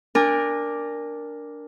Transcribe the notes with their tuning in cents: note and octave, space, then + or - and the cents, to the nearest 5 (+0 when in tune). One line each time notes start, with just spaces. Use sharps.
D4 -5 A#4 +0 G#5 -35